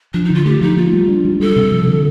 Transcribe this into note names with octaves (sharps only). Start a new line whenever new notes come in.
F3 D4
D#4
D3 F4
A3 G4
F3 D#4
A#3 F4
G3
D4
G3
G3 A4
C3
F3
D3